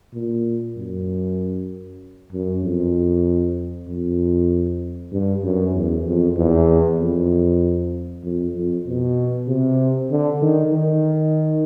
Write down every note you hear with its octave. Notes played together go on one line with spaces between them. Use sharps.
A#2
F#2
F#2
F2
F2
G2
F#2
E2
F2
E2
F2
F2
F2
B2
C3
D3
D#3
D#3